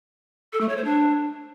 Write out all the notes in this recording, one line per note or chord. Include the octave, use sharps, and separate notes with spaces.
A4
A3
C#5
C5
D4